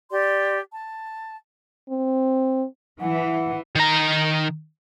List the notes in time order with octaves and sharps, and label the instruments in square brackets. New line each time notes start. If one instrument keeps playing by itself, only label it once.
[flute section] G4 D5 C6
A5
[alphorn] C4
[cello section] E3 [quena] F#5
[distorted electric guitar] D#3 A#5